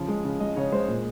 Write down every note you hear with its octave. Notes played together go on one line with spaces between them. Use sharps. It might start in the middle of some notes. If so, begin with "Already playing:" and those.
Already playing: C#3 F3
G#3
C#3
G#3 D#5
C#3 C#5
G#3 C5
A#2